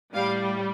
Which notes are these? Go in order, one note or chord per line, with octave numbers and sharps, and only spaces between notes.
A2 G3 F5